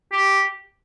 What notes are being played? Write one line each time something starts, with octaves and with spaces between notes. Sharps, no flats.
G4